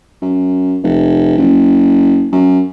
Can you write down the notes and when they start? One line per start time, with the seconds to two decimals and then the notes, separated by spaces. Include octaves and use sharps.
0.22 F#2
0.83 F1
1.38 F#1
2.32 F#2